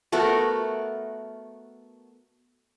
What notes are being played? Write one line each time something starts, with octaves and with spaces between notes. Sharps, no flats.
A3 B3 F#4 A#4